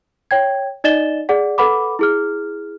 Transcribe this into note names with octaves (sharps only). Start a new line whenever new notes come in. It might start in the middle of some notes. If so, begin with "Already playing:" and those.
C#5 G5 G#6
D#4 D5 D#5 A6 E7 G7
G#4 D5 F#5
A4 B4 F#5 B5 D6
E4 G#4 F6